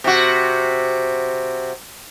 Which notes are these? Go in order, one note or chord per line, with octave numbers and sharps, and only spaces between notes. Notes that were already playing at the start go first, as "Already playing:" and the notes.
C3 F#4